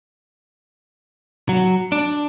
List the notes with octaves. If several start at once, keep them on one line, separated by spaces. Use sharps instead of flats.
F#3
D4